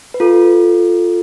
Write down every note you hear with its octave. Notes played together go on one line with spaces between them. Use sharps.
B4
F4 A4